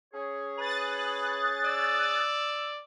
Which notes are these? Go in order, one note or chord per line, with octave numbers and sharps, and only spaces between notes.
C#4 G#4 C#5
B4 D#6 F#6 A6
D5 E6